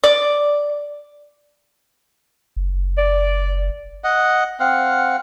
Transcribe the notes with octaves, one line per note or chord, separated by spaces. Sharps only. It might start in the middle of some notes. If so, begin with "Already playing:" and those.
D5
F#1
D5
D#5 F#5
C4 F5 F#5